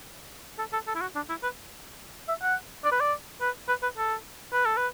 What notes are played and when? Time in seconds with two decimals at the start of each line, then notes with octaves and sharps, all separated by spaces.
0.59 A4
0.73 A4
0.88 A4
0.95 E4
1.01 F#4
1.15 D4
1.29 E4
1.43 B4
2.28 E5
2.42 F#5
2.85 D5
2.92 B4
3.00 D5
3.41 B4
3.68 B4
3.83 B4
3.98 A4
4.53 B4
4.65 A4
4.77 B4